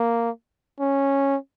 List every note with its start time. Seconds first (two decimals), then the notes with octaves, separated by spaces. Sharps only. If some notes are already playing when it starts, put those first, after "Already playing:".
Already playing: A#3
0.80 C#4